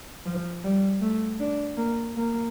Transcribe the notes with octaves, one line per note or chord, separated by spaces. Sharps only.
F3
G3
A3
D4
A#3
A#3